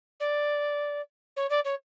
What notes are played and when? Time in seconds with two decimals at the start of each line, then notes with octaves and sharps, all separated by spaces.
0.20 D5
1.36 C#5
1.49 D5
1.64 C#5